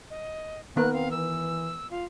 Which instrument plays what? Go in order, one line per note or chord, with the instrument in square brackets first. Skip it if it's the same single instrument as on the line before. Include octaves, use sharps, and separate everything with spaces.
[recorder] D#5
[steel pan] D#3 B3 A#4 [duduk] A#3 [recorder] F#6
[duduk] C4 [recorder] F5
[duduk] E3 [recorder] E6
[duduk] F4 [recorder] F5